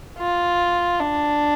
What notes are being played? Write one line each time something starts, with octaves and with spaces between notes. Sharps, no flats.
F4
D4